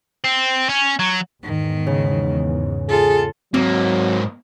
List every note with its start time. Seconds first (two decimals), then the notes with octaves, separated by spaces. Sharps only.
0.24 C4
0.69 C#4
0.99 F#3
1.43 E2 G#2 D#3
1.87 C#3
2.89 F4 G#4 A4
3.54 G#2 F#3 A#3 C4